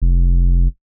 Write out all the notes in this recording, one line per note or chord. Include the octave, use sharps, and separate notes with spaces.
F1